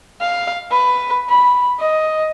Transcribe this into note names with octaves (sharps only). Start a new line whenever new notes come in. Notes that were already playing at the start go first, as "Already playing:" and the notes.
F5
B4
B5
D#5